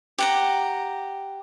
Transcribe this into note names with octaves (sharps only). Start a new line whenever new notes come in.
G4 F#5 A#5